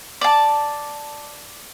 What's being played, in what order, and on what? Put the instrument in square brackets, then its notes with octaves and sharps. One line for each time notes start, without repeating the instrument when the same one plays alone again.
[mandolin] D5 A5